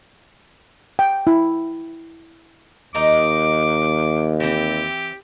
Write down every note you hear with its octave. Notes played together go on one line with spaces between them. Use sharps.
G5
E4
D#2 D#4 A#4 D#5 D6
E3 C4 G4